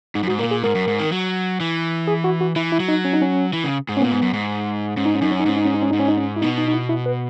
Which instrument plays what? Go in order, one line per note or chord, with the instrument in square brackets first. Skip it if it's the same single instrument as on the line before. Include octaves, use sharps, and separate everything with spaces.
[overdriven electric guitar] G#2 [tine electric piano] D#4
[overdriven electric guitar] F#2
[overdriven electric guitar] G#2 [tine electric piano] F#4
[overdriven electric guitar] A#2 [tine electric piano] A#4
[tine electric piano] G#4
[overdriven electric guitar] G#2 [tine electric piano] A#4
[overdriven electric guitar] F#2
G#2
D#3
F#3
E3
[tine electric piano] G#4
F#4
F#4
[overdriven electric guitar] E3 [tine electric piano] E4
[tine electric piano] E4
[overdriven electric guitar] F#3
[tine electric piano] D#4
C#4
D#4
C#4
[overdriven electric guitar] E3
C#3
G#2
[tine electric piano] C#4
[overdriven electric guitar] A#2 [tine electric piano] B3
[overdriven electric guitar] G#2
F#2
G#2
[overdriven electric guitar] G#2 [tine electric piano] C#4
[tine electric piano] D#4
C#4
[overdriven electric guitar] F#2 [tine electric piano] D#4
[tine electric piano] C#4
D#4
[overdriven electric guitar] G#2 [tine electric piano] C#4
[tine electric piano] D#4
C#4
D#4
C#4
[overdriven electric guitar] G#2 [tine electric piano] D#4
[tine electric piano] C#4
D#4
C#4
E4
[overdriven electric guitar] B2 [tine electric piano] D#4
[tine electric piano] D#4
D#4
E4
E4
B4